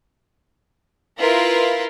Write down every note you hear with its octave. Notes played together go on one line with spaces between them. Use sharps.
E4 F4 A#4 B4